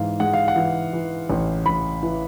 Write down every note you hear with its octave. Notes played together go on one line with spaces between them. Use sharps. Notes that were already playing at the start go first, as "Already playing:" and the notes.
Already playing: G#2 E3 F5
G#3 F#5
F5
F#5
E3
E3
A1
A1 B5
E3